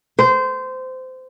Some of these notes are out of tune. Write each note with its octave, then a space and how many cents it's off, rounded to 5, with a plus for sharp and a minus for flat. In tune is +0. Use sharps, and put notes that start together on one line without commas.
C5 -20